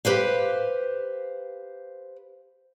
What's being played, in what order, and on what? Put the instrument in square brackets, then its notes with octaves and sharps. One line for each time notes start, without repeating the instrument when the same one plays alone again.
[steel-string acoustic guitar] G4 B4 C5 F5